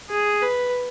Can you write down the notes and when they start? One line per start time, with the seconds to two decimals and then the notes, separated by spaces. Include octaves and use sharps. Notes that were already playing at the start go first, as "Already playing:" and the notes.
0.10 G#4
0.42 B4